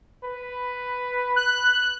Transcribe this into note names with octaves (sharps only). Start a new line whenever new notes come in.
B4
F#6